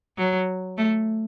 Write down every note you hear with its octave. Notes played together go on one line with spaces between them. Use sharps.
F#3
A3